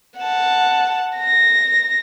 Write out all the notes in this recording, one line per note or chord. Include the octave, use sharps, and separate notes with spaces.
F#5 A5
A#6